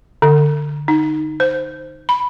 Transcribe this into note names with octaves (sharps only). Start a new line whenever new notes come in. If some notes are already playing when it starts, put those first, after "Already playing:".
D3
D#4
C5
B5